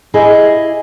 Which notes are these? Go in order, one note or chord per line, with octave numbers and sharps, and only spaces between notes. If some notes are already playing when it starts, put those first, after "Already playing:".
E4 G4 G#4 D#5